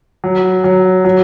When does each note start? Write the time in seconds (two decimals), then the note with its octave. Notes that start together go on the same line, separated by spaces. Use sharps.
0.24 F#3
0.64 F#3
1.05 F#3